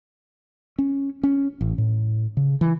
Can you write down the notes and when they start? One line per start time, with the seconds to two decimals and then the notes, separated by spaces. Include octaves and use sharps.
0.79 C#4
1.23 C#4
1.61 A1
1.78 A2
2.37 C#3
2.61 E3